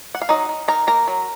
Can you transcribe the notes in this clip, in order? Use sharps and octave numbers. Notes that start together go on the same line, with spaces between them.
F#5
F5
F#3 D#4 D#5
D#3
D#4 A#4 A#5
A#3 A#4 A#5
F#3